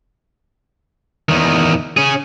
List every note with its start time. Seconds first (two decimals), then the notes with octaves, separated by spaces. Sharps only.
1.29 E2 D#3
1.97 C#4 G#4